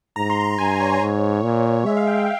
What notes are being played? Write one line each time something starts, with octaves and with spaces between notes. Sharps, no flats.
G#2 A#5
C6
A#5
G2 G#5
C#5
G#2
A#2
G#3 E5
F5
G5
G5